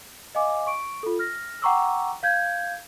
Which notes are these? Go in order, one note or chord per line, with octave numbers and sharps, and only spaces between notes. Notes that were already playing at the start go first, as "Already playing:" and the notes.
D#5 F5 G#5 D6
C#6 D7
F4 A4
F6 A#6
F#5 G5 A#5 C#6 D6 E6
F5 G6 G#6